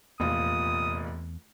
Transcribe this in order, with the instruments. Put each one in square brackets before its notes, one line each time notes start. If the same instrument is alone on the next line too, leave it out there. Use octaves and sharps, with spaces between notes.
[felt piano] F1 A#1 F4 [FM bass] E2 [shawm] D#6